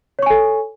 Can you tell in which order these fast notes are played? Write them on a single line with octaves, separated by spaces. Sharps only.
C#5 C#6 G#5 A4